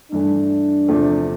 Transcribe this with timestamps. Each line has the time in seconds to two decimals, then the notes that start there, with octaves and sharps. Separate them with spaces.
0.11 G2 E3 A3 D4
0.88 E2 C3 F3 A3 C4